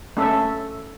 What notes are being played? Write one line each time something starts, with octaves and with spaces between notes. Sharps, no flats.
A3 C#4 A4 E5